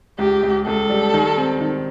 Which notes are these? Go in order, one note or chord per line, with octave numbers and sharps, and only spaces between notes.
C#2 G4
C#2
C#2 A4
G3
D#3
C4
D#3